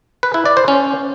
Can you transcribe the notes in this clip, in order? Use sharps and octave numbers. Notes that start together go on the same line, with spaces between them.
B4
E4
D5
C5
C#4